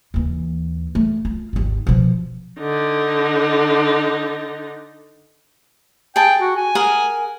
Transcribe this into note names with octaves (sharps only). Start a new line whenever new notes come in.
D#2 E3
A3
F4
G#1 D#2
B2 F3
D3 D#4
G#4 G5 A5
F#4
G#5
G#4 A#4 F#5